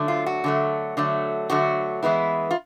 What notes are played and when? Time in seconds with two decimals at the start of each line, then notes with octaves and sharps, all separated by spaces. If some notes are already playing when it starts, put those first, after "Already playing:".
Already playing: D3 F#3 A3
0.08 F4
0.26 F#4
0.44 D3 F#3 A3
0.97 D3 F#3 A3
1.50 D3 F#3 A3 F#4
2.03 E3 G#3 B3 E4
2.51 F4